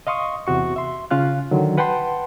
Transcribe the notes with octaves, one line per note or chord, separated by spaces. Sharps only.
D#5 F5 C6 C#6 D#6
E2 C3 F#4 C#6
E5 C6
C#3 C#4 F4 F5 F#6
D3 D#3 F#3
B4 F#5 G5 A5 B5 C6